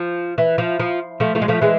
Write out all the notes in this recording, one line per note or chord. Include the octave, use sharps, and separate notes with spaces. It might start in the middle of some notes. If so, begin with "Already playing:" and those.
Already playing: F3
E3
F3
F3
F3 A3
F3 A3
G#3
F3 A3
E3 G#3